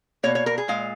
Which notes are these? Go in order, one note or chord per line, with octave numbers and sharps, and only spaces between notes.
B2 A#3 C#5
C#5
A#4
G#4
A#2 G#3 F5